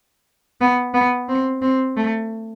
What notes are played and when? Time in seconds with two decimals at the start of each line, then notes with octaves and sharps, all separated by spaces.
0.61 B3
0.94 B3
1.29 C4
1.62 C4
1.97 A3